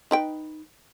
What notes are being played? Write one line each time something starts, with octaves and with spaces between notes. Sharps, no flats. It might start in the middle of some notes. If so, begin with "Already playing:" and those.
D#4 B4 G5